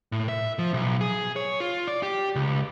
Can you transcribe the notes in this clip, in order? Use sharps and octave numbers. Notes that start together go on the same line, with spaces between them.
A2
E5
F3
B1
G#4
C#5
F4
D5
G4
C#2